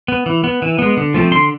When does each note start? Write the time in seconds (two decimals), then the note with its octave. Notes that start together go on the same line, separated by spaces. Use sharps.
0.08 B3
0.26 E3
0.44 B3
0.62 E3
0.79 G#3 B3
0.97 D3
1.14 F3 A3 C4
1.32 D3 C6